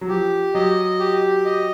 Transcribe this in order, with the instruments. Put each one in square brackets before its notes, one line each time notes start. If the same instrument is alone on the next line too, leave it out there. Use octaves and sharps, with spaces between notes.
[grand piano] F#3
[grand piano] F3 [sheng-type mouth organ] G4
[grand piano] F#3 [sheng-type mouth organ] D#5
[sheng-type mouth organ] G4
D#5